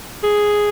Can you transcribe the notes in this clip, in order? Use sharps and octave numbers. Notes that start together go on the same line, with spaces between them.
G#4